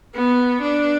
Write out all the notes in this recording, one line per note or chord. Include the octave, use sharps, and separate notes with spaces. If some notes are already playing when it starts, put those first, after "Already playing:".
B3
D4